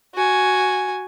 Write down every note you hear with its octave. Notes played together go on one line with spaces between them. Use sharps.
F#4 G#5